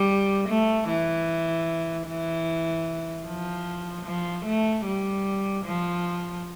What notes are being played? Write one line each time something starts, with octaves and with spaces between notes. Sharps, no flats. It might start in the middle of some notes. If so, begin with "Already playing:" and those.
Already playing: G3
A3
E3
E3
F3
F3
A3
G3
F3